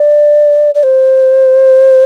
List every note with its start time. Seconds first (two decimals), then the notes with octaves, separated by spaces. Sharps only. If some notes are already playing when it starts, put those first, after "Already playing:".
Already playing: D5
0.75 D5
0.83 C5